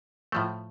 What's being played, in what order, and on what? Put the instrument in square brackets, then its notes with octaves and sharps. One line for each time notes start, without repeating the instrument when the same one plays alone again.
[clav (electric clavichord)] A2 F3 A3